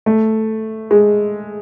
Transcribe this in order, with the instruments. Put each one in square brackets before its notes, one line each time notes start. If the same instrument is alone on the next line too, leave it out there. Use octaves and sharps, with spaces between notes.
[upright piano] A3
G#3